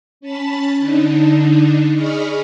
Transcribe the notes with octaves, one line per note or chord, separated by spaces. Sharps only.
C#4 A5 B5 A6
D3 D4 D#4
G#4 D5 D#5 B5 C#6 F6